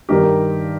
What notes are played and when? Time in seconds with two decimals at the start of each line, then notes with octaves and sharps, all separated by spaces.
0.09 G2 D#3 G4 A#4